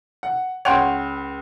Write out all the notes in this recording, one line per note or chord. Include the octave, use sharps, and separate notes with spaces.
F#5
C#2 C#5 F#5 G5 C6 F7